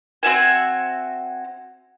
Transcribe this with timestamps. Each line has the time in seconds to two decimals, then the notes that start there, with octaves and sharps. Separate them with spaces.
0.23 C4 F#4 E5 G#5